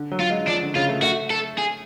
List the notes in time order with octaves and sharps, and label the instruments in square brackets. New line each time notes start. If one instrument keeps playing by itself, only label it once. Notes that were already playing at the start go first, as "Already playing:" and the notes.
Already playing: [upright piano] D3
F#3
[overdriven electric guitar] F4
[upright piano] G#3
[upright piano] F3 [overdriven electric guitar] D4
[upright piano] D3
[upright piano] C#3 [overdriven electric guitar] F4
[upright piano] A3
[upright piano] A3 [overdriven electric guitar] F#4
[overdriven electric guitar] A4
G#4